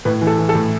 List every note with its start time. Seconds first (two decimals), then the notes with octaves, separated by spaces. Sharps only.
0.05 A2 B4
0.21 E3
0.27 A4
0.38 E3
0.49 A4
0.55 A2